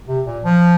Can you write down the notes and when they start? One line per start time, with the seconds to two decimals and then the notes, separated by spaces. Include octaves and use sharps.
0.08 C3
0.26 A#2
0.44 F3